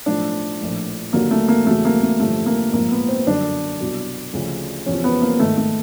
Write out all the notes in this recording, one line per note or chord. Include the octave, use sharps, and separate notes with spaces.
B1 A2 F3 D4
A#1 A2 F3
D#2 D3 F#3 A#3
A3
A#3
E2 C#3 F#3 A3
A#3
A3
A1 G2 D3 F3 A3
A#3
A#1 G#2 F3 A#3
B3
C4
G1 F#2 D3 D4
C2 B2 F#3
D2 C#3 F3
E2 C3 F3 C#4
B3
A#3
G#1 G#2 D#3 A3
A3